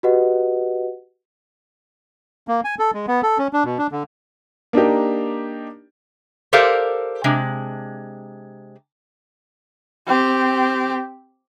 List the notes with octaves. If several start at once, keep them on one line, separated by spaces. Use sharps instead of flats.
F#4 G4 B4 D#5 F#5
A#3
G#5
A4
G#3
B3
A4
C#4
D4
B2
D4
D3
A#3 D4 D#4 G4
G4 A4 A#4 C5 D5 F5
C3 G#3 D4
C4 G4